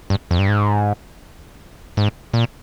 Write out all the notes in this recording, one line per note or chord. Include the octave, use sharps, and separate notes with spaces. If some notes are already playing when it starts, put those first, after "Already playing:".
G2
F2
G2
G#2
G#2
A#2